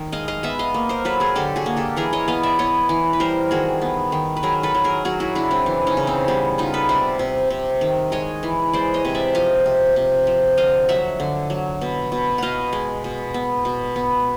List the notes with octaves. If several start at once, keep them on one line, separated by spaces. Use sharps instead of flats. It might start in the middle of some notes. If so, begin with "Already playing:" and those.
Already playing: D#3
G#3 D#5 F5
D#5 F5
B3 E5 F#5
D#5 F5
A#3
A#4 C5
F#3 A4 B4
G#4 A#4
D3 G4 A4
F#4 G#4
A#3
G4 A4
E3 G#4 A#4
C#5 D#5
B3 D#5 F5
D5 E5
B3 C#5 D#5
E3
B4
G3 A#4 C5
D#3 F#4 G#4
B3
D#3
B4
F#3 G#4 A#4
A4 B4
F#3
G#4 A#4
F#3 F#4 G#4
E4 F#4
C#3 D4 E4
C4 D4
E3
C#4 D#4
C#3
C4
G3 B3
B3 D#4 F4
A4 B4
C3 C5 D5
C3
C3
D#3
G#3 C#5 D#5
E3
G#3 C5 D5
C#5 D#5
C3
D5 E5
F3 D#5 F5
C3
C3
F3
D3 D#5 F5
F#3 E5 F#5
D3
F#3
B2
B2
B2 D#5 F5 F#5
G#3
B2
B3
B2
B3